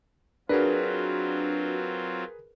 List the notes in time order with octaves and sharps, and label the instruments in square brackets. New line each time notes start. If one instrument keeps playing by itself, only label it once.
[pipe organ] F#3 C4 F4 [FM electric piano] D4 F#4 [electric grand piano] G#4 A#4 B4